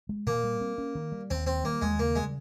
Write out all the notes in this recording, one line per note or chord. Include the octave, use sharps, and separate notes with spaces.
G#3
A#2 A#3
G3
C4
C#4
D#3
G3
D#2 C4
D#3 C4
G3 A#3
D#2 G#3
C#3 A#3
G3 G#3